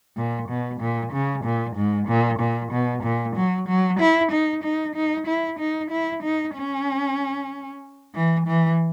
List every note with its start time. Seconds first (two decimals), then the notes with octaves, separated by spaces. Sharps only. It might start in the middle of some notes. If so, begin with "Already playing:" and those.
0.17 A#2
0.49 B2
0.81 A#2
1.12 C#3
1.44 A#2
1.76 G#2
2.08 A#2
2.40 A#2
2.72 B2
3.03 A#2
3.36 F#3
3.68 F#3
4.00 E4
4.32 D#4
4.64 D#4
4.96 D#4
5.27 E4
5.59 D#4
5.91 E4
6.23 D#4
6.55 C#4
8.15 E3
8.47 E3